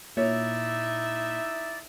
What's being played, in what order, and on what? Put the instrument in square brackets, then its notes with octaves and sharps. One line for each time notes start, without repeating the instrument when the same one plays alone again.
[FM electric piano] A#2 [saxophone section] D#4 E4 E5 [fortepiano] C#5 [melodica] D5